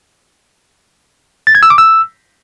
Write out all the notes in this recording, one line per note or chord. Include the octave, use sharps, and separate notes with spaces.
A6
G#6
E6
D6
E6